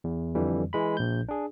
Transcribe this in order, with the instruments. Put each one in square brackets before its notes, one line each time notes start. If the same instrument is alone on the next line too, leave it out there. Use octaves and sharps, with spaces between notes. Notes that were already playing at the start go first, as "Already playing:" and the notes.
[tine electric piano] E2
F2 D3 E3 G3
E3 G#3 B5
A#1 G6
D4 G#4